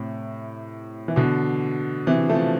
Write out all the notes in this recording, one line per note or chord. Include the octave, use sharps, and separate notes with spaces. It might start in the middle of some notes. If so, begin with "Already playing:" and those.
Already playing: A2 C3
E3
B2 D3
C3 E3
F3 A3